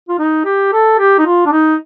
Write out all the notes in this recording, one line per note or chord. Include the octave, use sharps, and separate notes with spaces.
F4
D#4
G4
A4
G4
D#4
F4
D4
D#4